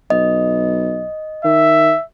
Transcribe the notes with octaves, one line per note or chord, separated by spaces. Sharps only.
B1 D#5
D#3 E5